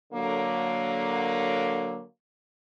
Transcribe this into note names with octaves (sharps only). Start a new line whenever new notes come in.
D3 F#3 A#3